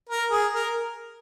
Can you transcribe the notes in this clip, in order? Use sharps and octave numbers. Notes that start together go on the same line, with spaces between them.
A#4
G#4
A#4